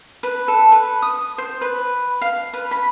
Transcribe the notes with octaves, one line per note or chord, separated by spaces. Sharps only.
B4
A4
B4
D#6
C5
B4
F5
B4
B5